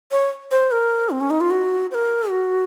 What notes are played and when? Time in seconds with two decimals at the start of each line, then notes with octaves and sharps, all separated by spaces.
0.12 C#5
0.51 C5
0.71 A#4
1.10 C4
1.21 C#4
1.30 D#4
1.41 F4
1.50 F#4
1.91 C5
1.95 A#4
2.30 F#4